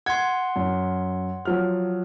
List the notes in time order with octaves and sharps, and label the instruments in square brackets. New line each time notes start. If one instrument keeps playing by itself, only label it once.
[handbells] F#5 C6 [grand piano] G#6
[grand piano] F#2
F3 F#3 F6